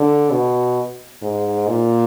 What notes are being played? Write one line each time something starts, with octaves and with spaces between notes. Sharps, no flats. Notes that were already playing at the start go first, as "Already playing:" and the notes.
Already playing: D3
B2
G#2
A#2